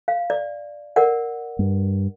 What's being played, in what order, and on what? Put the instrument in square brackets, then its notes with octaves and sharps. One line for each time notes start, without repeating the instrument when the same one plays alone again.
[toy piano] F5
D5
A#4 D5 F#5
[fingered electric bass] G2